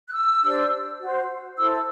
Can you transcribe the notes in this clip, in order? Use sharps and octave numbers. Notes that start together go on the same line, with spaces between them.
F#6
E6
D4 G4 C5
F#4 C5
E4 A4 C5 E6